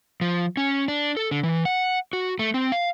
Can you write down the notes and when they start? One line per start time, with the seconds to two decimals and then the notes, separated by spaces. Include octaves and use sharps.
0.21 F3
0.57 C#4
0.88 D4
1.17 A4
1.31 D3
1.43 E3
1.65 F#5
2.13 F#4
2.39 A3
2.54 C4
2.72 F5